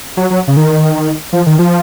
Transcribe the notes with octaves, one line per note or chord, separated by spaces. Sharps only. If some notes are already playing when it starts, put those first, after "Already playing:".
F#3
F#3
C#3
D#3
F3
D#3
F3